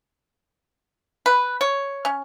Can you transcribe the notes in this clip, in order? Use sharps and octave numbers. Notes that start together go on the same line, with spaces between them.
B4
C#5
C#4